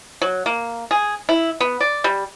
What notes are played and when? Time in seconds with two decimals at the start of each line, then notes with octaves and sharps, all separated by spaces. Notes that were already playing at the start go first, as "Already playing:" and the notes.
0.22 F#3
0.46 A#3
0.91 G#4
1.29 E4
1.60 B3
1.80 D5
2.04 G3